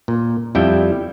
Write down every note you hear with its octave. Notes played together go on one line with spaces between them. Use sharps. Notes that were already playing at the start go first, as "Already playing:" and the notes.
A#2
F2 G3 E4 E5 G5